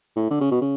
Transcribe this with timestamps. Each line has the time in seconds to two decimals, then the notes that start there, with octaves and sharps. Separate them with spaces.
0.16 A2
0.30 D3
0.41 C#3
0.51 B2
0.61 C#3